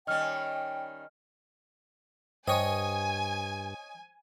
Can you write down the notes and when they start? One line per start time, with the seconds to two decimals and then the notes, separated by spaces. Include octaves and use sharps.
0.07 D#3 G3 C#4 D#5 G5 F6
2.48 G2 C5 C#5 D#5 G5 G#5 D#6